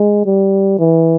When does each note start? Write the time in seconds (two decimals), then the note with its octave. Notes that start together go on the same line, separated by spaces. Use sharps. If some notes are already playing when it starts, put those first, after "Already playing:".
Already playing: G#3
0.26 G3
0.79 E3